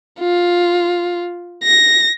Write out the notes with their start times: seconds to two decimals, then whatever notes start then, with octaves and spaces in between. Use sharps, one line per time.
0.20 F4
1.64 A#6